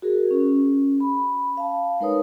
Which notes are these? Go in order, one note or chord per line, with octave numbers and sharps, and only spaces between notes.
F#4 G#4 A#4
C#4
B5
F5 A5
G#3 D#4 A#4 B4 C#5 D#6